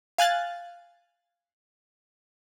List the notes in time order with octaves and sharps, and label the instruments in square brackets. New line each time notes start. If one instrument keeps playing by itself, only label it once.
[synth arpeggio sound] F5 G#5 F#6 A6